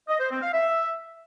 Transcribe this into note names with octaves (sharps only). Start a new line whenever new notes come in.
D#5
C5
C4
F5
E5